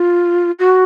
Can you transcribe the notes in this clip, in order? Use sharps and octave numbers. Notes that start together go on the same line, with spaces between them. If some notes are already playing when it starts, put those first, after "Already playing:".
Already playing: F4
F#4